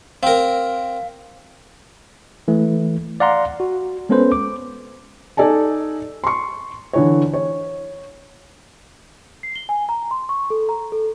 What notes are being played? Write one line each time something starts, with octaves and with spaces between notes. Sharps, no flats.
C4 A#4 F5
E3 A3
D5 F5 F#5 A#5 C6
F#4
G#3 B3 C#4 A4 B4 C5
D6
D#4 A4 D5 G#5 A5
C6 C#6
D3 E3 C#5
C#5
C7
G7
G#5
A#5
C6
C#6
A4
A#5
A4